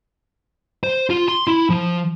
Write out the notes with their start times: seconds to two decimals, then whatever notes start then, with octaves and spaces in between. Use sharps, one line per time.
0.84 C5
1.10 F4
1.28 C6
1.48 E4
1.70 F3